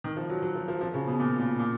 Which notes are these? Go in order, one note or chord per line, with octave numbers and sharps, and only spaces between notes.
D#3
F3
F#3
F#3
F3
F3
F3
C#3
B2
A#2
A#2
A#2